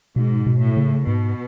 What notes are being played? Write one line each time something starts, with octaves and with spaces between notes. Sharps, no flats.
G#2 B2
B2
A2
C#3
G#2 B2